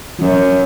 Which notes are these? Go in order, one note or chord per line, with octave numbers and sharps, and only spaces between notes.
F#2